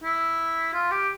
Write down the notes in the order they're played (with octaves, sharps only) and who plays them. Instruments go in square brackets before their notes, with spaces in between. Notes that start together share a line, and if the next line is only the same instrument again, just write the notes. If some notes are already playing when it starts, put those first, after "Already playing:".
[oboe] E4
F4
G4